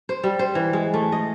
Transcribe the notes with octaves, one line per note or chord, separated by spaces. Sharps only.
C5
G3
C5
E3
G#3
A3
D#5